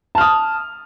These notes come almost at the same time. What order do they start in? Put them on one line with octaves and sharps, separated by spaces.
A5 F6 D#6